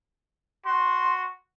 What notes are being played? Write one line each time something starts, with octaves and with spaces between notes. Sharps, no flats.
F#4 C6